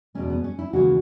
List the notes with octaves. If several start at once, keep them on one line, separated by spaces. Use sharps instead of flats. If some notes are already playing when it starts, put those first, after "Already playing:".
E2 B2 G#3 C#4
B3
C#4
E4
D#2 C#3 E3 G#3 F#4